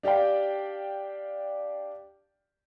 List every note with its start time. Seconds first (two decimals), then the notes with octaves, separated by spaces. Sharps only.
0.03 D4 G4 D5 F5 G5